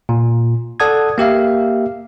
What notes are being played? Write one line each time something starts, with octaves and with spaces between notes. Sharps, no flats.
A#2
A4 D5 F#5 A5 D#6 G#6
A#3 G4 E5 F5